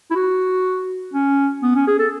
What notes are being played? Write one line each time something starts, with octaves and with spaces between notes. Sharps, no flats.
E4
F#4
C#4
B3
C#4
G#4
A4